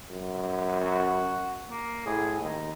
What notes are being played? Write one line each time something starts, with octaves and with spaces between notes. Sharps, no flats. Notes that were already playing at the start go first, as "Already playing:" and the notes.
F#2
F#4
A#3
A2 G#4
D#2 D#4